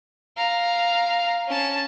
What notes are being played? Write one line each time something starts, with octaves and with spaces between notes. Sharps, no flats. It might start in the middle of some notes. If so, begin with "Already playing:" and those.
F5 A#5
C#4 A5